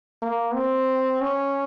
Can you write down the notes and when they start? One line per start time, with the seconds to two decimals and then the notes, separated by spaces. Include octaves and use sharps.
0.22 A#3
0.54 C4
1.21 C#4